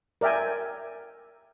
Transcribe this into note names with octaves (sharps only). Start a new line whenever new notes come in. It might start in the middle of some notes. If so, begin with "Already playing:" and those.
A#4 D5 E5 G5 G#5